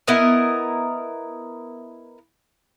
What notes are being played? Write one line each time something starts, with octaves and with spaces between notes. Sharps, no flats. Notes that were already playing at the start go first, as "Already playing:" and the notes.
B3 E4 A#4 D#5